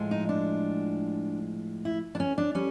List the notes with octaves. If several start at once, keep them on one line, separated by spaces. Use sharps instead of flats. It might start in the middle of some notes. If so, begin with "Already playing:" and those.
Already playing: A2 F3 G#3
D#4
D4
E4
D4
C#4
D4
G3 C#4